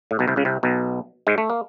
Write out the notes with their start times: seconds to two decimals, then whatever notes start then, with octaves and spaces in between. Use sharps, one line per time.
0.11 A2
0.19 B1 B2
0.28 C2 C3
0.36 C#2 C#3
0.45 C2 C3
0.63 B1 B2
1.27 G#2 G#3
1.38 A3
1.50 A#3